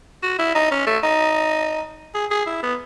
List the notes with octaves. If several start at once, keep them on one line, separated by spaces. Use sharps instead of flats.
F#4
E4
D#4
C#4
A3
D#4
G#4
G#4
E4
B3